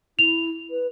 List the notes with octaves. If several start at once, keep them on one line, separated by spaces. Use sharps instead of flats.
E4 F7
B4